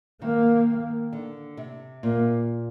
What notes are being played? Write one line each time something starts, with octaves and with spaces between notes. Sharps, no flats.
D#3 A#3
D3
C3
A#2 A#3